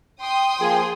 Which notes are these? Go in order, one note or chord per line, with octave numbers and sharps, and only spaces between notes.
G5 C6 D#6
F3 A#3 G#4